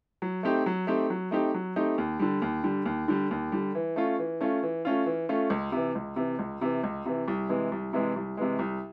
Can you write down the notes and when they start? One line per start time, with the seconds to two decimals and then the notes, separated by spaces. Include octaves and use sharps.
0.22 F#3
0.43 A3 C4 D#4 G4
0.66 F#3
0.87 A3 C4 D#4 G4
1.10 F#3
1.31 A3 C4 D#4 G4
1.54 F#3
1.76 A3 C4 D#4 G4
1.98 D#2
2.19 D3 G3
2.42 D#2
2.64 D3 G3
2.85 D#2
3.08 D3 G3
3.31 D#2
3.52 D3 G3
3.75 E3
3.96 A3 C#4 F4
4.19 E3
4.41 A3 C#4 F4
4.63 E3
4.85 A3 C#4 F4
5.06 E3
5.29 A3 C#4 F4
5.50 C#2
5.72 C3 E3
5.95 C#2
6.16 C3 E3
6.39 C#2
6.61 C3 E3
6.84 C#2
7.06 C3 E3
7.28 C2
7.49 C3 E3 G#3
7.72 C2
7.93 C3 E3 G#3
8.16 C2
8.37 C3 E3 G#3
8.59 C2